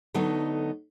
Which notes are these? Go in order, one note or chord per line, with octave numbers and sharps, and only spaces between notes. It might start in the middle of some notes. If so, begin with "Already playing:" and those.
D3 F#3 A3 B3 D#4